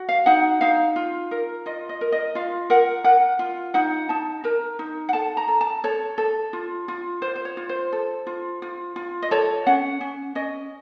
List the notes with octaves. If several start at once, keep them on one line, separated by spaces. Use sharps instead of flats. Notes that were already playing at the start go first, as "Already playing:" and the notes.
Already playing: F#4
F5
D#4 F#5
D#4 F5
F4
A#4
F4 D#5
D#5
A#4
D#5
F4 F5
A#4 F#5
A#4 F#5
F4
D#4 F#5
D#4 A5
A#4 A#5
D#4
F#5
A4 A5
A#5
A4
A5
A4 C#5
A4
F4
F4
F4 C5
C5
C#5
F4
C5
A4
F4
F4
F4
D#5
A4 C#5
C#4 F#5
C#4
C#4 D#5